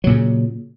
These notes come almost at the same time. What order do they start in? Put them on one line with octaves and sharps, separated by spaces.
F#3 A#2 C#3